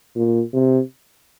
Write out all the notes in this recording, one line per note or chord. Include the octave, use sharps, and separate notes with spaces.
A#2
C3